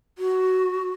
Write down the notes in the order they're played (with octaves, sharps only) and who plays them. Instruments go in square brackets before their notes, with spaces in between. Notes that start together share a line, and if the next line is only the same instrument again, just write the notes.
[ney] F#4